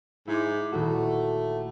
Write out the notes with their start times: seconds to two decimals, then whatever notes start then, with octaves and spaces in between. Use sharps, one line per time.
0.27 G#2 E4 D6
0.72 D#1 A3 F#4